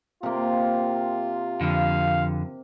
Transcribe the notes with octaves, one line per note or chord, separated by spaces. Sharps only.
C3 A#3 F4
F2 D3 F5